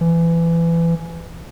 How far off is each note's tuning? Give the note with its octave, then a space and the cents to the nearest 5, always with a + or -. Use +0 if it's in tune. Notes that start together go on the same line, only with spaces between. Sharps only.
E3 +25